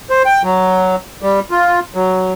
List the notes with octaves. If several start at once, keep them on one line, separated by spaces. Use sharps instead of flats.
C5
G5
F#3
G3
F4
F#3